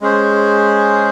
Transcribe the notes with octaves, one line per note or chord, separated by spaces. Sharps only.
G#3 C#4 G#4 C5